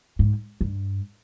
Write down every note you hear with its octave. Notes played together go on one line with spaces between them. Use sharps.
G#2
G2